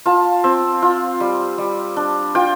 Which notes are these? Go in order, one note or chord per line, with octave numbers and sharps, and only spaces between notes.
F4 A5
C4
F4
G3
G3
D4
F4 G5